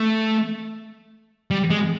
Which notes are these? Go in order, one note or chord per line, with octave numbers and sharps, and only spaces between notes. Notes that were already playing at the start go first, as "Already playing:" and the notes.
Already playing: A3
G3
G#3